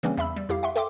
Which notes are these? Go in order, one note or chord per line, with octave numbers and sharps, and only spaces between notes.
C#3 E3 G3 A#3 C4 C#4
E2 E5 B5 E6
G3
F2 E4 G4 F5
E5 F#5 C6
A4 E5 G5 C6 D6